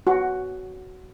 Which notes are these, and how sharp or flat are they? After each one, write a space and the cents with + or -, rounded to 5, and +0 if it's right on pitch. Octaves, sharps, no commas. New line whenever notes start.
F#4 +10